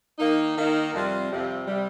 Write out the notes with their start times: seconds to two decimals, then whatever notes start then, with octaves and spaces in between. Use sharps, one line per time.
0.19 D#3 A#3 D#4
0.56 D#3 A#3 D#4
0.93 F2 C3 G3 C4 F4
1.31 F2 C3 G3 C4 F4
1.68 C3 G3